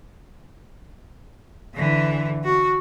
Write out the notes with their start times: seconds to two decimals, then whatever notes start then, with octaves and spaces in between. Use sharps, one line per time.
1.74 D3 E3
2.44 F#4